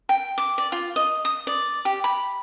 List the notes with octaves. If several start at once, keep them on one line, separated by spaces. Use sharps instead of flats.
G5
D6
D5
F4
D#5
D#6
D5
G4
B5